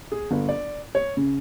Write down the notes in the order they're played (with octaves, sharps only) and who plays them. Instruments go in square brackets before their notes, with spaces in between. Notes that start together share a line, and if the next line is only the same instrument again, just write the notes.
[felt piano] G#4
G1
D5
C#5
C#3